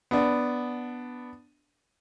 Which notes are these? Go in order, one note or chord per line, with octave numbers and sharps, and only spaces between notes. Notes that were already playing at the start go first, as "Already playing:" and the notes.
B3 D4